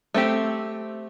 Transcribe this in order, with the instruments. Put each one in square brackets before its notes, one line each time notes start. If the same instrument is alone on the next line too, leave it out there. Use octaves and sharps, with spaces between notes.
[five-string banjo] A3 C4 G4